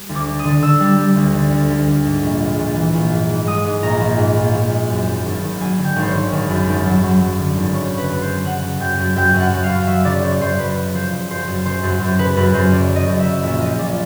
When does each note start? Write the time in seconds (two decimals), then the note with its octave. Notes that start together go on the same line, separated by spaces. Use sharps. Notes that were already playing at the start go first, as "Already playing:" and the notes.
Already playing: G3
0.09 D2
0.15 D6
0.27 D3
0.39 D#6
0.45 D3
0.62 D3 E6
0.80 G3
0.98 G3
1.16 D2
1.34 D3
1.51 D2
1.69 D2
1.87 D2
2.05 G#2
2.23 A#1
2.41 G#3
2.59 A#1
2.76 E3
2.94 A#1
3.11 G#2
3.29 G#2
3.47 G#3 D#6
3.65 G#2
3.82 A#1 A#5
4.00 A#1
4.18 G#2
4.36 A#1
4.54 A#1
4.72 G#3
4.90 F#2
5.07 G#1
5.25 G#1
5.43 G#1
5.60 F#3 G#5
5.78 D3
5.84 G5
5.96 G#1
6.02 C5
6.07 C#5
6.14 G#1
6.32 G#1
6.50 F#2
6.67 G#1
6.85 F#3
7.03 F#3
7.21 F#3
7.39 D3
7.56 G#1
7.74 F#2 C#5
7.92 C#3
7.98 B4
8.10 F#2
8.21 C5
8.28 F#2
8.45 C#3 F#5
8.62 C#3
8.80 F#2 G5
8.98 F#2
9.16 F#2 G5
9.34 F#2
9.40 F#5
9.53 F#2
9.64 F5
9.70 F#2
9.87 F#3 E5
10.05 C#3 D5
10.23 F#2 C#5
10.41 F#2 C5
10.58 F#2 B4
10.76 C#3
10.94 F3 C5
11.12 C#3
11.30 F#2 C5
11.47 F#2
11.65 C#3 C5
11.83 F#2
12.01 F#2 C5
12.18 C#3 B4
12.36 F#2 B4
12.54 F#2 C5
12.72 C#3 D5
12.90 C#3
12.96 D#5
13.08 F#2
13.19 E5
13.26 C#3
13.43 A#1 E5
13.61 F3 D#5
13.78 A#1 D5